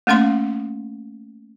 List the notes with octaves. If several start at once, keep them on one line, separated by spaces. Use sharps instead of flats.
A3 A#3 C#4 F5 C6